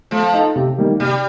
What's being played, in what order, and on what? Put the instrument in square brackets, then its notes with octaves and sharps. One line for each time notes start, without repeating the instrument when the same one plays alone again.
[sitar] F3 [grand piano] A3
[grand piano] D#4 A4
C3
D#3 G3 A#3 D#4
[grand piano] C3 [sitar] G3